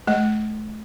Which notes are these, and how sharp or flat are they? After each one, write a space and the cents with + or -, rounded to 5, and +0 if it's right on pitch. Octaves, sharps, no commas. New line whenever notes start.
A3 -40 D#5 +0